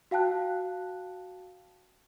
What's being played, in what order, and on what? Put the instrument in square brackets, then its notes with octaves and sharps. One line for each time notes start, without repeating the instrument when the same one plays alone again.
[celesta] F#4 F5 G5 A5 F#6